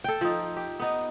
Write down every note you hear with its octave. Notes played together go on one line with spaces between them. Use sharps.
A4 G5
F3 D#4
G4
B3 D#4